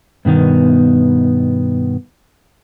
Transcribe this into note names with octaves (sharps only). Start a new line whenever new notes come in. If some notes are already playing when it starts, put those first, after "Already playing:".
G2 B2 D#3 B3